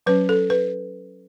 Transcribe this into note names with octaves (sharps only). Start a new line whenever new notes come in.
F#3 C#4 B4
A4
B4